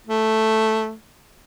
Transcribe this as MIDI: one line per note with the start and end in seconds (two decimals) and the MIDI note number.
0.07 0.94 57